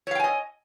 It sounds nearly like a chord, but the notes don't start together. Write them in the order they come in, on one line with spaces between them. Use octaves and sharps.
C#5 F5 G5 G#5 D#5